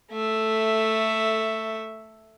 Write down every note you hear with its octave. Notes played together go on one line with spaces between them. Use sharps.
A3 E5